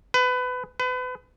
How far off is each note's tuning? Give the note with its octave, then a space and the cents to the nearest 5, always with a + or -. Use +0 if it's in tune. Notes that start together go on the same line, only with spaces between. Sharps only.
B4 +25
B4 +35